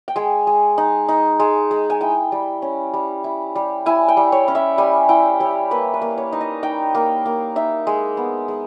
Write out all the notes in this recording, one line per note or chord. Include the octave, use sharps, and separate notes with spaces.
G5
G#3 G#5
G#3
D#4
D#4
G#3
G#3
G#5
E4 G5
G3
C#4
G3
E4
G3
E4 G#5
G5
G3
C#5
C#4
E5
G3 G#5
E4 G5
G3 C#5
A#3 B4
B4
A#3
C#5
D#4
D#5
D#4 G5
A#3
A#3
D#4 E5
G#3
B3
G#3